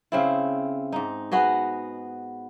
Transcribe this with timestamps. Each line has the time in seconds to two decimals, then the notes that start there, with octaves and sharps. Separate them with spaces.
0.12 C#3 C4 E4
0.92 G#2 D#4
1.32 B3 F#4 G#4 D#5